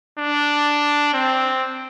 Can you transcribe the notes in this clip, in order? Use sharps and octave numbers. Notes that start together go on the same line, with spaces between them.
D4
C4